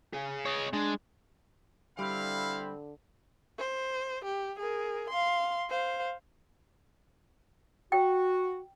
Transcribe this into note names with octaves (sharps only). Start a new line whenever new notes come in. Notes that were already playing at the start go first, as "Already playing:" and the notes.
C#4 G#4
C#5 D#5
G#3 D4
D3 G3 C4 E4 F5 B5
C5
G4
G#4 A#4
F5 C6
C5 F5
F#4 G5